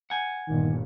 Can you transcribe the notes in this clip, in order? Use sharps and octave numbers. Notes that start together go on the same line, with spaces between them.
F#5 G#5
G1 A#2 D#3